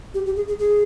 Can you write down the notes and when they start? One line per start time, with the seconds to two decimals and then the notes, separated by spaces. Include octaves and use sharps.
0.14 G4
0.26 G4
0.36 G#4
0.48 G#4
0.59 G#4